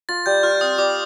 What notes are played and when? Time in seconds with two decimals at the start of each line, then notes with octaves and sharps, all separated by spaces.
0.09 F4 A6
0.26 G3 G6
0.43 F4 F6
0.61 C4 D#6
0.78 G3 D6